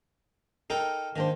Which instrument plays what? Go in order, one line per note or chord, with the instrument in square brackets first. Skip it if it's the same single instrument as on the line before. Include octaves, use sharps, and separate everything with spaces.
[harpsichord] D#4 A4 G5 [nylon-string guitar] A#4
[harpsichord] D#3 [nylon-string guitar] A#3 D4 C5